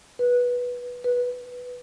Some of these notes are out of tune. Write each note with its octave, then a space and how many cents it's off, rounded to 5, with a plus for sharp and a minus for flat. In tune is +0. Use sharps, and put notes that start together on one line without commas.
B4 -10
B4 -5